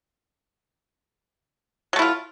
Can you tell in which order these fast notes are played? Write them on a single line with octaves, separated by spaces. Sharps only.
F#3 A3 E4 F4